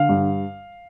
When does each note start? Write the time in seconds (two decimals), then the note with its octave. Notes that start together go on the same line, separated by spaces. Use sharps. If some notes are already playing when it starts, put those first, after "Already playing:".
Already playing: D3 F5
0.09 G2